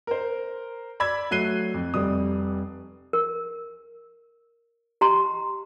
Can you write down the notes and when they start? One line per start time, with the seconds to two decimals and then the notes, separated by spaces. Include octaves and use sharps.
0.07 A#4 C5
1.00 D5 B5 E6 G#6
1.31 F#3 A3 F#6 C7 D#7 G7
1.74 F2
1.94 F1 G3 D#6
3.13 A#4
5.01 G4 D#5 A#5 C6